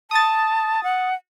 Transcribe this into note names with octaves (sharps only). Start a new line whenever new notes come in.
A5 D#6 A6
F#5